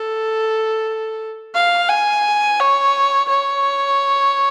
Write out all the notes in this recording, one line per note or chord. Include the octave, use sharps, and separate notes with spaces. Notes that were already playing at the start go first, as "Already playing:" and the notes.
Already playing: A4
F5
G#5
C#5
C#5